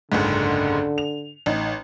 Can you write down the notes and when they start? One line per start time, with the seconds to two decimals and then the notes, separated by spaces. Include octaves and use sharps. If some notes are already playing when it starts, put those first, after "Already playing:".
0.12 F#1 C#2 G#2 D3
0.98 F7
1.46 A1 D#4